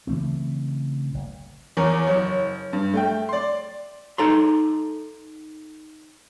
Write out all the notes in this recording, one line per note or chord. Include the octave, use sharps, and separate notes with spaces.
C#3 E3 A3 C4
F#1
E2 A#4 C#5
F#1 C#5
G2
A3 G5
D5 C6
D#4 A4 A#5 C6